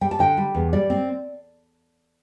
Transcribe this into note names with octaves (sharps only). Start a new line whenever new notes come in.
G3 G5
A5
D3 G5
G3
E2
G3 D5
C4